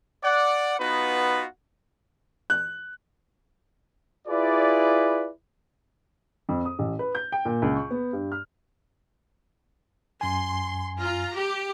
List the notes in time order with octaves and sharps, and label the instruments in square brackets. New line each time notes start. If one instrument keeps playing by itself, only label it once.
[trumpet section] D5 F#5
B3 D#4 F4 F#4 B4
[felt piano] F#6
[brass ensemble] E4 F4 G#4 B4 D5
[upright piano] F2
D#6
A1
B4
G6
G5
A#2
C#2
C#6
B3
G2
F6
[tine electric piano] F#2 G#5 [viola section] C6
[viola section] F4 A#5
G4